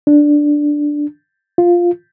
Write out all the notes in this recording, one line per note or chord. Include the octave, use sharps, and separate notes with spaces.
D4
F4